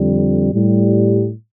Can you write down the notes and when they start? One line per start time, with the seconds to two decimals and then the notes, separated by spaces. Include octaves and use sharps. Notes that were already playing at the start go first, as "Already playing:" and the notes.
Already playing: F2 D3 G3
0.53 A2 G3